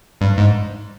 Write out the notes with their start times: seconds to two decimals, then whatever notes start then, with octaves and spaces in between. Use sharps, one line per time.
0.21 G2
0.37 G#2